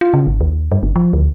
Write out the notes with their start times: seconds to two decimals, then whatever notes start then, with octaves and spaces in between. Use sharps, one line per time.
0.01 F4
0.14 C#3
0.27 G#1
0.41 D#2
0.72 G2
0.83 G1
0.96 F3
1.13 D2